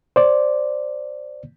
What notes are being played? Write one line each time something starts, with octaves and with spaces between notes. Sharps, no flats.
C5 D5